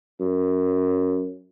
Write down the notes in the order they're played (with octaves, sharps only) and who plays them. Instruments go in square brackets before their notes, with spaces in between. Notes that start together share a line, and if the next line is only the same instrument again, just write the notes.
[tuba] F#2